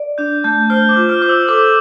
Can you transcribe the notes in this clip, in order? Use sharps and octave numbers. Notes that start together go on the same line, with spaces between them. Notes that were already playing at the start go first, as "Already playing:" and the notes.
Already playing: D5
D4 G6
A3 G6
C5 F6
D6
F4
F6
C5 D6
E6
A4 D6